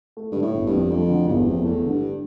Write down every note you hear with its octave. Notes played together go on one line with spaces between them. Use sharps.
A3
G2 D3
A2
G1
G2
F2
F2 A3
D3
G1 E2
F2
E2 A3
D3
G2